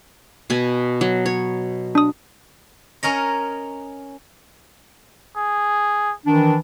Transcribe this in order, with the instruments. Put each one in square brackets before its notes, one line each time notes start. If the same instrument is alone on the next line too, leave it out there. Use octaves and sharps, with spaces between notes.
[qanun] B2 G#5
F#3
C#5
[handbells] D4 D#6
[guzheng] C#4 A#4 C#5 D#5
[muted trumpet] G#4
[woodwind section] D#3 E3 D4